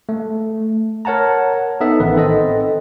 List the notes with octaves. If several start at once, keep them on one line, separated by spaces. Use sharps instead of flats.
A3
A#4 C#5 F#5 A5 A#5
B3 D#4 A4 E5
A1 D#3 B4
C4 A4 D#5